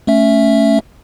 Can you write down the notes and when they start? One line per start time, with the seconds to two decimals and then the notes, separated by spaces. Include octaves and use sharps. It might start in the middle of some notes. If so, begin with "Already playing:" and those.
0.07 A3 C#4 E5